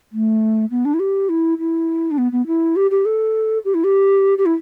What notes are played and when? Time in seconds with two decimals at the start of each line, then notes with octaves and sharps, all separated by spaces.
0.12 A3
0.71 B3
0.85 D4
0.94 E4
1.00 G4
1.29 E4
1.59 E4
2.11 D4
2.18 B3
2.32 B3
2.47 E4
2.76 G4
2.91 G4
3.05 A4
3.65 G4
3.74 E4
3.84 G4
4.38 G4
4.46 E4